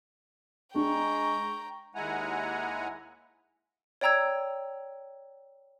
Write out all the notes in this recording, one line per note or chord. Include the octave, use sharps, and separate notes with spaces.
G#3 D4 G5 A#5 C#6
D#2 G#3 E4 F#5 G#5 A#5
C#5 D5 G5 A#5 E6 G#6